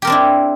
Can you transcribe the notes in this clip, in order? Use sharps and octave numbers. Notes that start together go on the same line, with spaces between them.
C4 D4 E4 G4 A#4